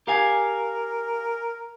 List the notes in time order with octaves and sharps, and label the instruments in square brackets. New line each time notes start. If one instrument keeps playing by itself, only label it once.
[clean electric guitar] G4 F5 G#5 [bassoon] A#4